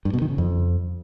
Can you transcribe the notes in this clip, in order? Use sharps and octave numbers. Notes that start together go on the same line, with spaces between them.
G2
B2
D#3
C#3
F2